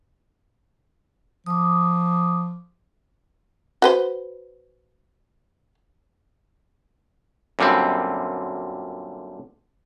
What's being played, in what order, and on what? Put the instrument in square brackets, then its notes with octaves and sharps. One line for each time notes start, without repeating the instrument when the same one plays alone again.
[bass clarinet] F3 [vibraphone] D6 D#6
[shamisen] F#4 B4 C5
[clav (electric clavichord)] F#2 A#2 D3 G3 C4